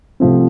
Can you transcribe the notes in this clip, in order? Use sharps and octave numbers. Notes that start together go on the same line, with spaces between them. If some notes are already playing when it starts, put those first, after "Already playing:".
C2 C3 F3 A3 C4